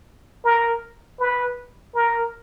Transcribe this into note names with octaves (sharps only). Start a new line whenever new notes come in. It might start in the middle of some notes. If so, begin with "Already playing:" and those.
A#4
B4
A#4